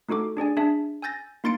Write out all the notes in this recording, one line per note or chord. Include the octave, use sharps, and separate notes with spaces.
A3 D#4 F#4 A4 D6
D4 G#4 D5 G#5
D4 G#4 E5 A5
G#5 E6 G6 A6 A#6
A#3 D#4 C6 A6 C#7 D7